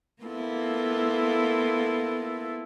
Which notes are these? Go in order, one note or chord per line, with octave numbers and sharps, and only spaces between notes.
A#3 B3 E4 F4 A4